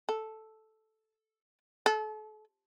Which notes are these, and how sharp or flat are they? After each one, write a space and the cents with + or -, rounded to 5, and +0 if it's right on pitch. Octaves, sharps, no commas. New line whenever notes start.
A4 -5
A4 -35